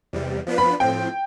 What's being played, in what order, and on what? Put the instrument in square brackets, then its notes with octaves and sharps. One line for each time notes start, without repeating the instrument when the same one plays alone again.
[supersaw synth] E2 C3 G3
F3 B3 D4 F4 B4
[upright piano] B5
[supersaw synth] A2 F3 C4 [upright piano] G5